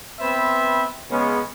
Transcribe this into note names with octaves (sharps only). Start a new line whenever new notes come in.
B3 C4 B4 C5 E5
C#3 G#3 B3 C#4